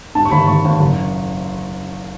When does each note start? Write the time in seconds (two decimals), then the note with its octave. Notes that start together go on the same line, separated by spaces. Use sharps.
0.15 G#2 A5
0.25 C#6
0.32 G#1 B5
0.48 G#1 C#6
0.65 G#1
0.80 F#1